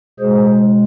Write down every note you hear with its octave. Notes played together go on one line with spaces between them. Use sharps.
B2 G#3 G#4 C5